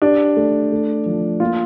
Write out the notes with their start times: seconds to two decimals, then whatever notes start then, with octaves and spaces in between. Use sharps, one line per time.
0.02 D4 G4
0.37 A3
0.72 A3
1.06 F3
1.40 A#3 F4